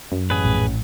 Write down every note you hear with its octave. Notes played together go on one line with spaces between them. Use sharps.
F#2
A1 G#4 B4
A#1 A2